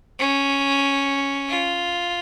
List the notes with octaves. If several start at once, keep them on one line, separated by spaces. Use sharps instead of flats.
C#4
F4